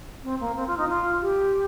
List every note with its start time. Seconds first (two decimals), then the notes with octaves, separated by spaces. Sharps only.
0.24 C4
0.40 A#3
0.56 C4
0.67 F4
0.77 D#4
0.89 F4
1.21 G4